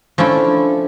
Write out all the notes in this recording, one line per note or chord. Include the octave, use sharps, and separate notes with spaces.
F3 A3 C#4 D4 E4